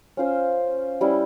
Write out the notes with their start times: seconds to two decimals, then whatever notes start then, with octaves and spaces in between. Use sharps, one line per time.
0.17 C#4 F4 C5
1.01 G3 C#4 E4